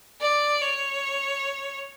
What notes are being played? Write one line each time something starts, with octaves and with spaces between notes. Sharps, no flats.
D5
C#5